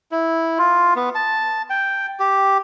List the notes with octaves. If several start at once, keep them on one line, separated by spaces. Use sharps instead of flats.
E4
F4
B3
A5
G5
G4